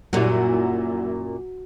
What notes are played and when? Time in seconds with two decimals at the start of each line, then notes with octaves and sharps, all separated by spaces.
0.13 F#2 A#2 F#3 G3 C#4 E4 F#4